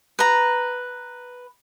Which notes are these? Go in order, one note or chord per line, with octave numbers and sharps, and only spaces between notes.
B4 A#5